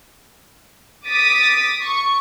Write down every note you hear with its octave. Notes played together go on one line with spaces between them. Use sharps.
D6 D#6 A6 B6
C#6